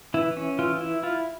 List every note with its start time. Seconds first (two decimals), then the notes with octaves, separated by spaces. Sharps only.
0.14 E3 E4
0.37 C#4
0.59 E3 F4
0.81 E4
1.03 E4 F4